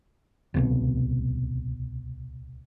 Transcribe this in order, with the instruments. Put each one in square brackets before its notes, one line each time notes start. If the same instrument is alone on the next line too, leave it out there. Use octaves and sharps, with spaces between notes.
[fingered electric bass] D1 C2 B2